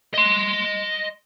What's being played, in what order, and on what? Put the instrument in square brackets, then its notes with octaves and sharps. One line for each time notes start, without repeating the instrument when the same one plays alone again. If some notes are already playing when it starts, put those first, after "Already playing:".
[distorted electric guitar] D#5 C6